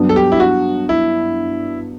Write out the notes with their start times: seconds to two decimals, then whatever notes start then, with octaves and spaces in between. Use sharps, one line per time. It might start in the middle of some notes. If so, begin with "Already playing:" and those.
Already playing: G2 F#3 B3 D4
0.09 A4
0.16 G4
0.32 E4
0.40 F#4
0.89 E4